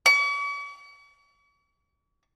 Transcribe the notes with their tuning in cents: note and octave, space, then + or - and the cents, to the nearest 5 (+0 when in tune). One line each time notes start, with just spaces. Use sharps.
C#6 +45